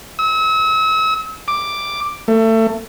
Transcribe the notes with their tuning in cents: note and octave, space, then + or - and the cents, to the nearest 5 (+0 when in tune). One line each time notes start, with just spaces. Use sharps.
E6 -40
D6 +5
A3 +25